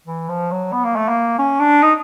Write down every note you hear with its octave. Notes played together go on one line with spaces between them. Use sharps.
E3
F3
F#3
B3
A#3
A3
A#3
C#4
D4
D#4